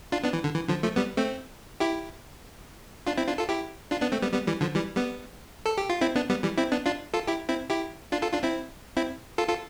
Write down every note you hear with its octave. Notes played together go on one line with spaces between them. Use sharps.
D4 F4
B3 D4
E3
D3
E3
D3 F3
F3 A3
G3 B3
A3 C4
E4 G4
D4 F4
C4 E4
D4 F4
F4 A4
E4 G4
D4 F4
B3 D4
A3 C4
G3 B3
G3 B3
E3 G3
D3 F3
E3 G3
G3 B3
A4
G4
F4
C4 E4
B3 D4
G3 B3
E3 G3
C4 E4
B3 D4
D4 F4
F4 A4
E4 G4
C4 E4
E4 G4
D4 F4
F4 A4
D4 F4
C4 E4
C4 E4
F4 A4
F4 A4